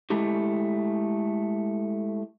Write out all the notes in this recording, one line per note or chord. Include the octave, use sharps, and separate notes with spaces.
G#3 A3 E4 G4